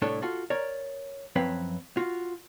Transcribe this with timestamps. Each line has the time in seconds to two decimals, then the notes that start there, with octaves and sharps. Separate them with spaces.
0.02 C2 A2 D4 A4 C#5
0.22 F4 F#4 A4
0.50 A#4 C#5 D5 A#5
1.36 F#2 F3 C4 B4 C#5 F5
1.97 F4 F#4